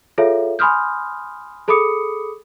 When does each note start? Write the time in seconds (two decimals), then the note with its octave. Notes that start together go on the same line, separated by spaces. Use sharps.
0.18 F4 G#4 A4 C#5 E5 F5
0.59 G#5 B5 C6 D#6 F6 G6
1.68 G#4 A4 B5 D6 D#6 C#7